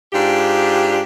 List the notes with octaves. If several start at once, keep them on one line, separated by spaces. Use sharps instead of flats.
G#2 D4 F4 G4